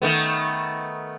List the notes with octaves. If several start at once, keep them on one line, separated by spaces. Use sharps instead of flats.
D#3 A3 B3